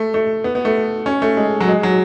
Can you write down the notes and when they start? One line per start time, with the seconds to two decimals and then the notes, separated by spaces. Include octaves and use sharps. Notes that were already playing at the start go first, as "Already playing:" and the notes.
Already playing: A3
0.14 A3
0.44 B3
0.55 B3
0.65 A3
1.06 C#4
1.22 A3
1.37 G#3
1.60 F#3
1.68 G#3
1.83 F#3